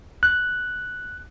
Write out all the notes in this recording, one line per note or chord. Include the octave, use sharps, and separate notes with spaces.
F#6